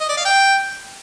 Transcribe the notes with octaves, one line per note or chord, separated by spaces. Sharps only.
D#5
D5
F5
G5